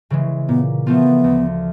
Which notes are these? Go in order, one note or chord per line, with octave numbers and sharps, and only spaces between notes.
C#3 E3 G#3
A#2 B3
F3 A3 B3 C4 F4
D2